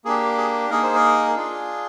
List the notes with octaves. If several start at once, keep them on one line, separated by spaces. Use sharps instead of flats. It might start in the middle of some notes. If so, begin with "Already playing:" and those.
A#3 D4 G4 G#4
G#4
A#3 D#4 G#4 A#4
C5
A#4
D4 F4 G#4